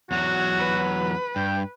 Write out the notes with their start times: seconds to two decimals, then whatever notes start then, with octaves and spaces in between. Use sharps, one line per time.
0.11 E2 F#3 F#4
0.58 B4
1.36 G2 G5